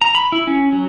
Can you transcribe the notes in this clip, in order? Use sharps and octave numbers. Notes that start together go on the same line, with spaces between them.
A#5
B5
E4
C#4
F#3